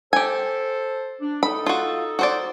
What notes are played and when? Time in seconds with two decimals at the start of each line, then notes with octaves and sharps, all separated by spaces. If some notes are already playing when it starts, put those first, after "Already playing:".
0.13 G4 A4 C5 G#5
1.21 D4
1.43 D#4 A4 B5
1.66 F4 F#4
2.19 F#4 C5 D5